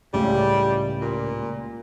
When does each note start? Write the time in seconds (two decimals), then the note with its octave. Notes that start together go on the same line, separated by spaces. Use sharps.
0.14 C#2 A2 C#3 G3
1.01 A#2